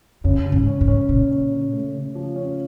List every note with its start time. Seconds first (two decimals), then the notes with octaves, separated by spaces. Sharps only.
0.24 F#2 C#3
0.46 C#3
0.52 G#2
0.67 C#4
0.81 G#2
0.88 C#4
1.09 A#2 C#3
1.30 C#4
1.52 C#3
1.73 A3
1.94 C#3
2.15 F3
2.36 C#4